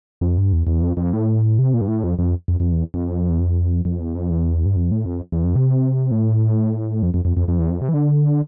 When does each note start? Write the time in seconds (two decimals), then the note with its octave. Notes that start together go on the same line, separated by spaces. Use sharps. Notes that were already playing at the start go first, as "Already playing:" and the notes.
0.21 F2
0.38 G2
0.53 E2
0.67 E2
0.82 F2
0.97 F2
1.13 A2
1.59 C3
1.74 A#2
1.81 G2
1.88 A2
2.04 F2
2.19 F2
2.48 F2
2.60 F2
2.72 E2
2.94 F2
3.30 E2
3.40 F2
3.85 F2
4.00 E2
4.15 F2
4.30 E2
4.66 G2
4.76 F2
4.91 A2
5.06 F2
5.32 E2
5.44 F2
5.56 C3
6.11 A2
7.03 F2
7.14 F2
7.25 F2
7.37 F2
7.48 F2
7.59 E2
7.70 F2
7.82 C3
7.89 E3
7.94 D3